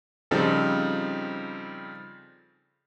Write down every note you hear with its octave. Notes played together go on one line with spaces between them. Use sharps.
C#3 F3 G3 C4 D#4 A4